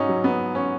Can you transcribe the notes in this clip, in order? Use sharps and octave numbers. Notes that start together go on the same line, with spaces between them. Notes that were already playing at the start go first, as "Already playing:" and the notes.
Already playing: G#2 C#4 D#4 F#4
F#3
B3
C#4